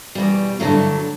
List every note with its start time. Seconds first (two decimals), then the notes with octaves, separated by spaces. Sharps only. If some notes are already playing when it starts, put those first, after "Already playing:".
0.15 E2 B2 G3
0.60 G2 D3 F#3 A3 E4